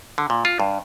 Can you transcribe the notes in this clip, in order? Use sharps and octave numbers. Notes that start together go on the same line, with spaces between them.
D3
A#2
F4
G2